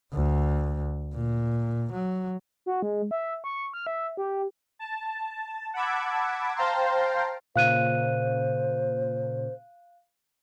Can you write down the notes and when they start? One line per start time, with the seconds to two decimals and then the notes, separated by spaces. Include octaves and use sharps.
0.13 D2
1.15 A#2
1.92 F#3
2.66 F#4
2.82 G#3
3.11 E5
3.44 C#6
3.74 F6
3.87 E5
4.17 G4
4.79 A5
5.74 F#5 A5 B5 D6 E6 G#6
6.55 C5 F5 G5 A5 A#5 C6
7.56 A#2 C#3 C5 F5 F#6 D#7